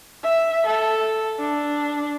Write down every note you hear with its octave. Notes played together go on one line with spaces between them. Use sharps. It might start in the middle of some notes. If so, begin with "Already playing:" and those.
E5
A4
D4